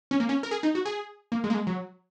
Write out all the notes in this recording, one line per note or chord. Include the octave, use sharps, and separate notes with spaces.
C#4
A#3
C#4
A#4
G#4
D#4
F#4
G#4
A#3
G#3
A#3
G#3
F#3